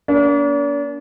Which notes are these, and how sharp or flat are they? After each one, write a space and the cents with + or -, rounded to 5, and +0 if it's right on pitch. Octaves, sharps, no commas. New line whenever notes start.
A#3 +30 D4 -40